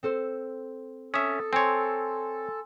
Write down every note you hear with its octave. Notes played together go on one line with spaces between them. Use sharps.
C4 A4 C5
C#4 A4 E5 D#6
C4 C#5 G#5 C6